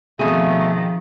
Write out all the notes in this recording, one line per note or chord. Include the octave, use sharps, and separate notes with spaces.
F2 B2 D#3 F3 A3 G#4